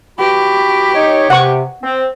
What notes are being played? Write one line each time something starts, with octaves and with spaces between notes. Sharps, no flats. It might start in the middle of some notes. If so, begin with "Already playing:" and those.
E3 F#4 G4 B5
D#4 C#5
C3 F#5 C#6
C4